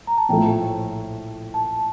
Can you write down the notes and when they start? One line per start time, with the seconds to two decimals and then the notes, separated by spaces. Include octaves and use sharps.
0.07 A#5
0.18 A5
0.29 A#1 A2 F3 A3 G5
1.54 A5